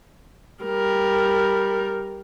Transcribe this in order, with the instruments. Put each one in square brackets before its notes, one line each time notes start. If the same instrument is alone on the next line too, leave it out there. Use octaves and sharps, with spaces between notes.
[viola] G3 A#4